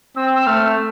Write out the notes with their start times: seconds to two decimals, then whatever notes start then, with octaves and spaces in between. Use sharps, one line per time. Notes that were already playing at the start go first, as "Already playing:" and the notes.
0.16 C4 E6
0.36 E6
0.47 A3 F6